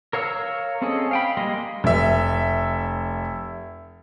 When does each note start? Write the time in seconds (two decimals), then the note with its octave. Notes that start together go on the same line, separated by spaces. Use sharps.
0.13 A#4 C#5 F5 A#5 E6
0.82 C4 C#4 G#4 A4 D#5
1.11 F5 G5 B5
1.37 G3 G#3 A#3 D#5 C6
1.84 F1 E5